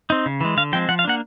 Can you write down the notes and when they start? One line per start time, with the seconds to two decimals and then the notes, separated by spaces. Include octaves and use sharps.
0.10 C4 D#4
0.26 C#3
0.41 E3 G#3
0.57 D3 F5
0.73 F3 G#3 C4 G5
0.89 F3 F#5
0.99 F5
1.04 A#3 D4 F#5